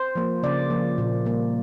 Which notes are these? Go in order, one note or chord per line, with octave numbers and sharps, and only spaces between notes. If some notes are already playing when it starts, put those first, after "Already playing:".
Already playing: C5
F3 A#3
C#3 D5
F3 A#3
A#2
G3 A#3